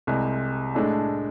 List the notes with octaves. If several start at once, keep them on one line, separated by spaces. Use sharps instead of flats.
C2 C3 G#3
A2 G#3 D4 A4